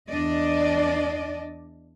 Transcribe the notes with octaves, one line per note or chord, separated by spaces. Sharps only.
E2 D4 D5 D#5